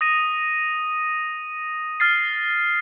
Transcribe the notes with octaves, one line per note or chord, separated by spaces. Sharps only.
D#6 A#6 D#7
F6 A6 C7